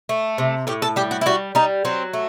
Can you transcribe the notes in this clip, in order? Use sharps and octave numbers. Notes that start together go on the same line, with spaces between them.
A3
C3
A2 G4
A4
G3 G4
F#4
E4
G3 F#4
G3 D#4
F#3 C4
A3